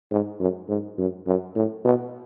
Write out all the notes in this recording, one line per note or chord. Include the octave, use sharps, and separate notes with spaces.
G#2
F#2
G#2
F#2
F#2
A2
B2